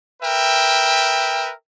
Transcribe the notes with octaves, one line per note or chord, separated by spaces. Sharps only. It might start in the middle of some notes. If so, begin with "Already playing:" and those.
A#4 B4 E5 G5